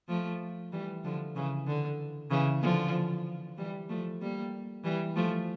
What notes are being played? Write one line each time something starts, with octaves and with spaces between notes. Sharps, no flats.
F3 A3
E3 G3
D3 F3
C#3 E3
D3
C#3 E3
D3 F3
E3 G3
F3 A3
G3 A#3
E3 G3
F3 A3